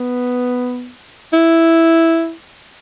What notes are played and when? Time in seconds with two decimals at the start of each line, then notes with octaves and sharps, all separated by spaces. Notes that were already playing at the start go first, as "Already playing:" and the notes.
Already playing: B3
1.33 E4